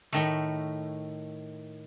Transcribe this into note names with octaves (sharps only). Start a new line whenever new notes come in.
A2 D#3 A3